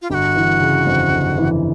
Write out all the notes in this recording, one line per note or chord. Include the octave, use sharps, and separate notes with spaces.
F4
G1 F#4 G4
E3
C#3
F2
G1
E3